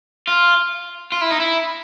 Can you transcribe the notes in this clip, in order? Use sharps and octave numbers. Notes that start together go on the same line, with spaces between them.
F4
F4
E4
D#4
E4